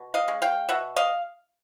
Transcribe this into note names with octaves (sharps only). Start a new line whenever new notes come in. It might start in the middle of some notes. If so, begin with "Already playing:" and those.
Already playing: B2
D#5 F5
G#3 C#4
F5 G5
B2 E5 F#5
D#5 F5